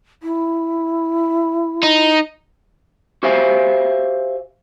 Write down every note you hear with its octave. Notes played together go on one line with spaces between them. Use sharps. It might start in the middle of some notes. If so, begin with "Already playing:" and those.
E4
D#4
F#4 G4 C5 E5 F5 G#5